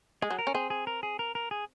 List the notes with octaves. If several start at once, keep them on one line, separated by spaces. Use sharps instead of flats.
G#3 G#4
F#3
A#4
C#4
C4 G#4
G#4
A#4
G#4
A#4
A#4
G#4